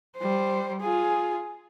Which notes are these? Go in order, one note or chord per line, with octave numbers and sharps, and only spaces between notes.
G3 C5
F4 G#4